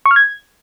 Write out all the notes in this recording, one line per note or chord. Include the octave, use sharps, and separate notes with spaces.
C#6
F6
G#6